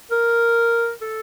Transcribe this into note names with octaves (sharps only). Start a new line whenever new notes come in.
A#4
A4